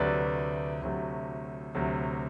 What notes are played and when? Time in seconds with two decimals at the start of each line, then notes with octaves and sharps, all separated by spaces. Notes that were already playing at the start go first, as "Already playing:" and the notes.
Already playing: D2 C3 F#3 A3 B4 D5
0.82 D2 C3 F#3 A3
1.75 D2 C3 F#3 A3